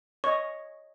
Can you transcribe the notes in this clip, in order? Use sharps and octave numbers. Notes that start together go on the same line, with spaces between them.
C#5 D#5 C#6